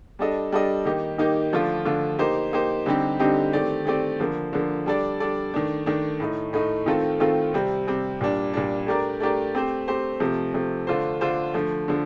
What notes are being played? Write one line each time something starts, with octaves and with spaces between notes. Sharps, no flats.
G3 D4 A4 D#5
G3 D4 A4 D#5
D#3 A#3 D#4 G4
D#3 A#3 D#4 G4
D3 F3 A3 D4 F4
D3 F3 A3 D4 F4
A#3 D#4 G4 C5
A#3 D#4 G4 C5
D3 G3 C4 D#4 G4
D3 G3 C4 D#4 G4
D#3 A3 C4 G4 D5
D#3 A3 C4 G4 D5
D3 F3 A#3
D3 F3 A#3
G3 D4 A4 D5
G3 D4 A4 D5
D#3 A3 D4
D#3 A3 D4
A2 A3 D#4
A2 A3 D#4
D#3 A3 C4 F4 A4
D#3 A3 C4 F4 A4
C3 G3 C4
C3 G3 C4
A#2 G3 D4
A#2 G3 D4
A3 D4 G4 A#4 D5
A3 D4 G4 A#4 D5
A3 C4 G4 C5
A3 C4 G4 C5
C3 F3 A3
C3 F3 A3
D3 A3 D4 F4 C5
D3 A3 D4 F4 C5
D3 F3 A3
D3 F3